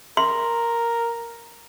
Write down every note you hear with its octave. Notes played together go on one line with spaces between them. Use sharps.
A#4 C6